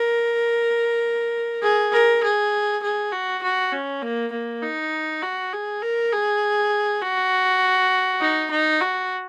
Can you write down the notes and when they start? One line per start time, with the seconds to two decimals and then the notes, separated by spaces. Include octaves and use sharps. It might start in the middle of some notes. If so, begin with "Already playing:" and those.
Already playing: A#4
1.63 G#4
1.93 A#4
2.23 G#4
2.83 G#4
3.13 F#4
3.43 F#4
3.73 C#4
4.03 A#3
4.32 A#3
4.63 D#4
5.22 F#4
5.53 G#4
5.82 A#4
6.12 G#4
7.02 F#4
8.21 D#4
8.51 D#4
8.81 F#4